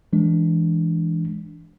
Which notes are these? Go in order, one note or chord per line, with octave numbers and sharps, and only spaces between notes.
E3 G#3 D4